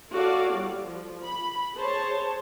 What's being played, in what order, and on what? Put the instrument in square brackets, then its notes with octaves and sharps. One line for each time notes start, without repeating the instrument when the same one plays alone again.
[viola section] F#4 A4 C#5 D5 F5
G3
F3
B5
G#4 C5 C#5 A5